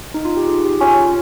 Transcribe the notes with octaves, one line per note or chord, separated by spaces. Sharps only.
D#4
F4
G4
G#4
G4
C#4 F4